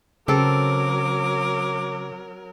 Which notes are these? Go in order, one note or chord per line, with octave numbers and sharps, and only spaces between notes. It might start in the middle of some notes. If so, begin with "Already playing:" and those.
C#3 F#3 C4 A4 A#4 D6